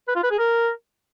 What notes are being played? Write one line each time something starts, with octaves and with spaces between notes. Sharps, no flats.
B4
F4
B4
G#4
A#4